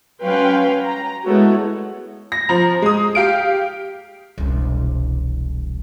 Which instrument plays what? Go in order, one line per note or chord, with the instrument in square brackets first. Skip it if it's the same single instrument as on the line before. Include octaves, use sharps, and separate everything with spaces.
[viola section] F#3 C#4 B4 F5 G5 C6
A#5
G#3 A3 B3 E4 F#4 C#5
[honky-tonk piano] A#6
F3 A#5
G#3 D#6
G4 F5 D7
[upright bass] E1 C2